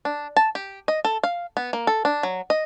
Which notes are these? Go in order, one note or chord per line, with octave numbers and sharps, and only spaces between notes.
D4
A5
G4
D#5
A4
F5
B3
A#3
A4
D4
F#3
D#5